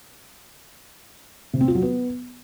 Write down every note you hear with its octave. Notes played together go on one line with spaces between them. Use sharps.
C3
C4
F4
F#3
B3